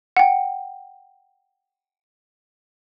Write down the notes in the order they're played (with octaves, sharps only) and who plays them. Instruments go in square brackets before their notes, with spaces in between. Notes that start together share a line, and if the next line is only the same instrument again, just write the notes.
[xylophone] F#5 G5